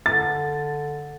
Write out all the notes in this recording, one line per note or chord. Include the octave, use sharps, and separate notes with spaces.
D3 A6